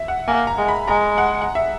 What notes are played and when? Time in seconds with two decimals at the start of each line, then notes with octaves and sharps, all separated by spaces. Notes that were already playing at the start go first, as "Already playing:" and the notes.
Already playing: E5
0.08 F#5
0.28 A#3 G#5
0.47 A#5
0.58 G#3
0.68 B5
0.88 G#3 A#5
1.18 F#5
1.42 F#5
1.55 E5